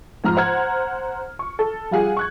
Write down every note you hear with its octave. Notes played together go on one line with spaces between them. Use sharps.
F2 G#2 A#5 F6
C5 F#5 A#5 F6 G#6
C#6
A4
G3 F4 G#4 F#5
C#6 F#6 G#6